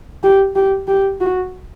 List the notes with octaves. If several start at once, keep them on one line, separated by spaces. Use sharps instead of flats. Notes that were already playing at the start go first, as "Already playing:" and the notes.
G4
G4
G4
F#4